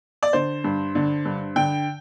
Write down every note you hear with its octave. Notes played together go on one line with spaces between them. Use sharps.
D5
D3 C5
G2
D3
G2
D3 G5